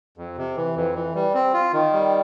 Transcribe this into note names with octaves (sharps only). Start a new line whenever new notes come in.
F2
C3
E3
F2
E3
G3
C4
F4
D#3
G3